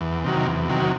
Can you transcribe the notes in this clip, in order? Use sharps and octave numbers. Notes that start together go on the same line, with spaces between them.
E2
C3 D#3 F#3
E2
C3 D#3 F#3